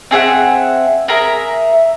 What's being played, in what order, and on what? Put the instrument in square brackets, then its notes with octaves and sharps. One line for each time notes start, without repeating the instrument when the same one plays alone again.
[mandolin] C4 G#4 E5 F#5
G#4 A#4 E5 A#5